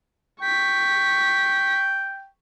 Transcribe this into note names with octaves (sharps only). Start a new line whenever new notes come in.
G5 C#6 B6